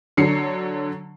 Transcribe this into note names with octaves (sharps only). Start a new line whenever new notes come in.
D3 F#3 C7 C#7